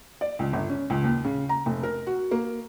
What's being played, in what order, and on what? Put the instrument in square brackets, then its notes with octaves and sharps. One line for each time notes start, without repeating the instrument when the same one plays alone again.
[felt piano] D5
C#2
G1
C#4
C#2
D#2
C#3
A#5
F1
A#4
F#4
A#3